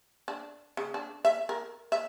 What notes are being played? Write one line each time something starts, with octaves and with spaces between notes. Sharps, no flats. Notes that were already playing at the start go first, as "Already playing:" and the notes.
D4
C#3
D4
E5
A#4
E5